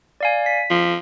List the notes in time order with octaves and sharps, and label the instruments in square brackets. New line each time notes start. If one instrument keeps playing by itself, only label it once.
[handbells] D5 F5 G#5
B6
[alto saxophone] F3